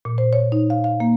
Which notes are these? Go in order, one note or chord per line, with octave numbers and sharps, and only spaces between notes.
A#2
C5
C#5
D#4
F5
F5
A#3